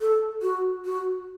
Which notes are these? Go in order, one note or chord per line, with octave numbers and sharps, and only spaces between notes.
A4
F#4
F#4